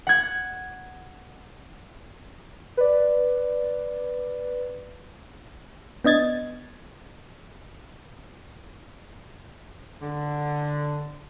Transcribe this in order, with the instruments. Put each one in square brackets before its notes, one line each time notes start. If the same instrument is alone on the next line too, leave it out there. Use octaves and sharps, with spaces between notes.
[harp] F#5 G#6
[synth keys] B4 D5
[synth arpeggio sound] B3 D4 D#5 G#6 A6
[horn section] D3